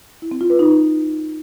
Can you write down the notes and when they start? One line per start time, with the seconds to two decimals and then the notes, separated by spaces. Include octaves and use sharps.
0.22 E4
0.31 C4
0.41 F4
0.50 B4
0.59 D#4